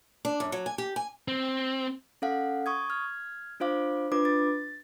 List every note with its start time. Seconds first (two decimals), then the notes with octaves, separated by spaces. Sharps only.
0.25 D4
0.40 F#2
0.52 F#3
0.66 G#5
0.78 G4
0.96 G#5
1.28 C4
2.22 C#4 A4 F5 F#5
2.66 C#6 D#6 G#6
2.90 F6 G#6
3.60 D4 F4 C5 F5 D6
4.12 D4 F4 B4 D6
4.25 A6